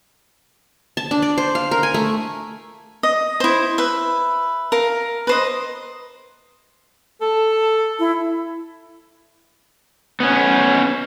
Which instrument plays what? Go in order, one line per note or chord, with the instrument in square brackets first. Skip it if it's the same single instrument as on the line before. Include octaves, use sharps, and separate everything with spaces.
[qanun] A5
D4
D5
C5
F5
A#4
G#5
A3
[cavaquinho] D#5
E4 C5
B4 E5
A#4 F5
B4 C5 D#5
[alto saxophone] A4 [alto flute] A5
[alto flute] E4
[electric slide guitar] B3 C#4